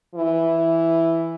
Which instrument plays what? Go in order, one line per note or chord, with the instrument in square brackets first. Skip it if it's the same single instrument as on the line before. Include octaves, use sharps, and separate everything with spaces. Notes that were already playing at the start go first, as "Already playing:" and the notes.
[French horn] E3